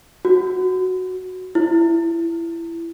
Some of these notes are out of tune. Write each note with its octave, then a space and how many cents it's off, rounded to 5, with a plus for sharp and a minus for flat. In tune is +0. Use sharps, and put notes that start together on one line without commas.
F#4 +0
E4 +20